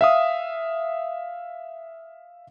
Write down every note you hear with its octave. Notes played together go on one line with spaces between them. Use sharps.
E5 F5 D#6